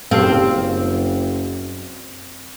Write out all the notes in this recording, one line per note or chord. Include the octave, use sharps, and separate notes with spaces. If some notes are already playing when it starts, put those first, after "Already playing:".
F#1 F#2 C4 G4 A4 F5